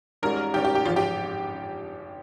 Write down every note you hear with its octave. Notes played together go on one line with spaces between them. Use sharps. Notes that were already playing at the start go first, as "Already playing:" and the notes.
G#1 G#2 G3 C#4 A#4
G#1 G#2 G3 C#4 G4
G4
G4
G#1 G#2 F3 F4
G4